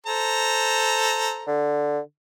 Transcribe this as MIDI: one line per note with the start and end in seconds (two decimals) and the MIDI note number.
0.07 1.48 69
0.07 1.48 72
0.07 1.48 82
1.47 1.99 50